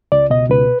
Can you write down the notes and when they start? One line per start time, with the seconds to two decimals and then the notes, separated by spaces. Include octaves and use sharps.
0.12 C#2 D5
0.30 B2 D#5
0.50 C#2 B4